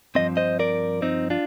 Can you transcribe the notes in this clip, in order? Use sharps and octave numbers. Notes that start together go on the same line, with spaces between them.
G2 F3 C4 D#5
C5 D#5
A#4 D5
C4 D#4
D4 F4